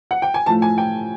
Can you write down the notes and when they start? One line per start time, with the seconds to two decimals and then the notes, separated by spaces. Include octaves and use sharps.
0.11 F#5
0.22 G5
0.34 G#5
0.46 A2 F3 A3 A5
0.62 G#5
0.78 G5